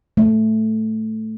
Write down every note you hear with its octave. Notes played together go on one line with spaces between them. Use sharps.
A3